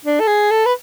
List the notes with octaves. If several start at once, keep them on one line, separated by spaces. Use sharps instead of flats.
D4
A4
G#4
A4
B4